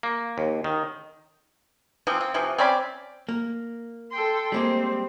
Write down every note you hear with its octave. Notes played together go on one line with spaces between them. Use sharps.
A#3
D#2
D#3
E3 F3 C4
C4
C3 E3 F3
C4 C#4 D5 B5
A#3
A4 G5 C6
G3 G#3 A#3 C4